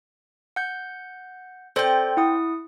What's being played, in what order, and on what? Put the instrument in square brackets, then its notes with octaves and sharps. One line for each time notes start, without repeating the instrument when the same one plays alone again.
[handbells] F#5 G6
[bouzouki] C4 G5 [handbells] A4 C5 D5
[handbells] E4 F#5 D#6